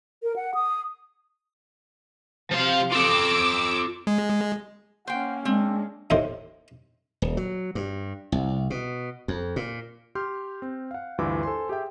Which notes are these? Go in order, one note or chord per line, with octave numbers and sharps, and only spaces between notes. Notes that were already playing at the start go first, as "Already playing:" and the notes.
A#4
F#5
D#6
C3 F3 F5 C6
F4 A4 D6 E6
G#3
A#3 C#4 C5 F#5 G5
G#3 C4 D4
D#2 A2 D#3 C5
D#1
F#3
G2
C2
B2
F2
A#2
G4 C6 F6 G6
C4
F5 F#5
D2 G2 E3 F4 D6 E6
A4 C5 G#5 C6
G4 G#4 E5 G5